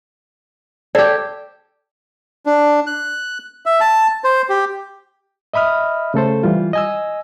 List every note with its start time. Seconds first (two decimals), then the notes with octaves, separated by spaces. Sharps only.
0.95 G4 A4 D5
2.46 D4
2.87 F#6
3.66 E5
3.80 A5
4.24 C5
4.49 G4
5.54 D#5 E5 B5 D#6 F6
6.14 C#3 A3 A4 C5
6.43 E3 G3 F4
6.73 D#5 G#5 E6